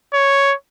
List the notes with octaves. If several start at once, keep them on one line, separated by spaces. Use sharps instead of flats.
C#5